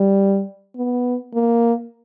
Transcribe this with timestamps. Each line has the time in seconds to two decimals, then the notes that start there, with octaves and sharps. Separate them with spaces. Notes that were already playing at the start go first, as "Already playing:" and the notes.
Already playing: G3
0.77 B3
1.34 A#3